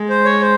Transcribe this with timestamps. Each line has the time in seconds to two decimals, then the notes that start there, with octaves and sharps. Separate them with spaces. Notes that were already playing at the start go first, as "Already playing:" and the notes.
Already playing: G#3
0.09 C5
0.25 C#5
0.41 C5